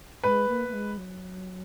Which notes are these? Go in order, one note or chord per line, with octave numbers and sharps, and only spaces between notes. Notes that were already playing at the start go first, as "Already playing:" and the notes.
G#3 B4
A#3
A#3
G#3
F#3